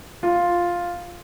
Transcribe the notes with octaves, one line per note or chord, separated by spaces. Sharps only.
F4